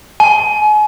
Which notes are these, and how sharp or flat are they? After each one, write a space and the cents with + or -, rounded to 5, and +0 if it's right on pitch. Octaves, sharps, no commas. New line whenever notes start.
G#5 +35